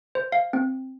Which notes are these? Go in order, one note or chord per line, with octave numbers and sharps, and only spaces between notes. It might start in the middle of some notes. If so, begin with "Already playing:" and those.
C5
F5
C4